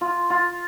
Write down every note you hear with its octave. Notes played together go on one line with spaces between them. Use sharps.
F4
F4